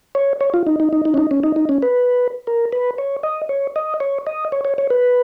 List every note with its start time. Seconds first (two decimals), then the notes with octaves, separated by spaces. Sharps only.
0.15 C#5
0.41 C#5
0.54 F4
0.67 D#4
0.80 D#4
0.93 D#4
1.05 D#4
1.14 C#4
1.18 D#4
1.31 C#4
1.43 D#4
1.56 D#4
1.69 C#4
1.82 B4
2.47 A#4
2.72 B4
2.98 C#5
3.23 D#5
3.49 C#5
3.76 D#5
4.00 C#5
4.27 D#5
4.52 C#5
4.65 C#5
4.78 C#5
4.90 B4